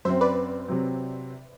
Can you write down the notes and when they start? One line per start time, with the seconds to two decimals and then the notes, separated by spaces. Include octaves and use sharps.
0.05 F#2 F#3 C4 C5 E5
0.21 B4 D5
0.68 C3 F#3 C4